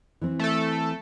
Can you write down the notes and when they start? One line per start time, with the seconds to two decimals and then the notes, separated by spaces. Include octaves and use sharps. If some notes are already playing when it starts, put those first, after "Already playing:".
0.21 E3 C4
0.39 A3 A4